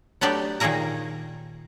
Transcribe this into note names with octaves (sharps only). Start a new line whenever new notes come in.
F#3 A3 B3 D4 G4 D5
A#2 D#3 A#3 G#4 A#4 A#5